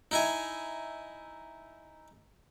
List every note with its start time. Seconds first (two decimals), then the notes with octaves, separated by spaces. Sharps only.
0.11 D#4 E4 G#5